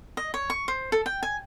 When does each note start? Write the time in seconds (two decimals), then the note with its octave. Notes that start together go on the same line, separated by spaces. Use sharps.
0.17 D#5
0.34 C#5
0.50 C#6
0.68 C5
0.92 A4
1.06 G5
1.23 G#5